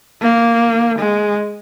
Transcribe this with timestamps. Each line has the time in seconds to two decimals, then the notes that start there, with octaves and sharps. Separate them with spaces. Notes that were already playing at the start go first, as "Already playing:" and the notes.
0.21 A#3
0.99 G#3